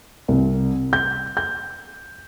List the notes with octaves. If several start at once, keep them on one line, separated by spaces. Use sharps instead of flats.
C2
G6
G6